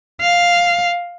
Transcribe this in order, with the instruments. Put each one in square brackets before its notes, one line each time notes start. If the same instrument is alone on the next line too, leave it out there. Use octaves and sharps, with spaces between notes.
[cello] F5